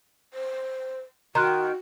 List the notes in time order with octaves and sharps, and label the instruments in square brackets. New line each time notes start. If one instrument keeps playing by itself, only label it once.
[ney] C5
[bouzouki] D#3 [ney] F#4 [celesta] A#5 C6 F#6